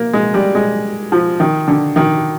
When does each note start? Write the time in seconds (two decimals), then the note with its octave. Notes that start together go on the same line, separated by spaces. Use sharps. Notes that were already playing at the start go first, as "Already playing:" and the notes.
Already playing: A#3
0.13 G#3
0.34 G3
0.55 G#3
1.12 F3
1.40 D#3
1.68 D3
1.96 D#3